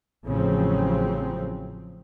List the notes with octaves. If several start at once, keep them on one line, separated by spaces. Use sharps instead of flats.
A1 C#3 F3 F#3 C4